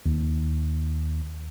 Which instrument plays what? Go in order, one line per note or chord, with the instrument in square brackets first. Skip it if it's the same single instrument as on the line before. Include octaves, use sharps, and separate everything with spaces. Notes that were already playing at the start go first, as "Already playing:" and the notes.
[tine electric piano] D#2